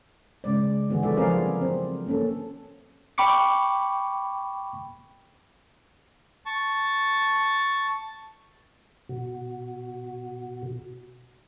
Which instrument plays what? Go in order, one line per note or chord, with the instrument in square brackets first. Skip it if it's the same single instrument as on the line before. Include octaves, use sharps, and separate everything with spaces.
[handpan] C#3 G#3 D5
D3 E3 B3 F#4 G#4
F#3 E4 A4 D5 E5
F3 C4 G#4 A#4 D5 F5
C4
A#3 C#4 A4
[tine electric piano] G5 B5 C#6 D6 C#7
[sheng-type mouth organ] A5 C#6
[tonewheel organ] B2 F#4